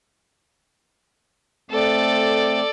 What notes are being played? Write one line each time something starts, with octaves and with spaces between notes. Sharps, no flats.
A3 C4 A4 D5